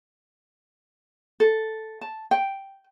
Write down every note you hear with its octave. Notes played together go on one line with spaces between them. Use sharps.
A4
A5
G5